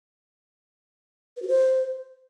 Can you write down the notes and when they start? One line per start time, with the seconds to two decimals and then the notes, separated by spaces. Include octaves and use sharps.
1.37 B4
1.42 F#4
1.48 C5